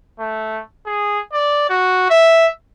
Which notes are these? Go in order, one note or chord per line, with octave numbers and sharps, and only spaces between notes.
A3
G#4
D5
F#4
E5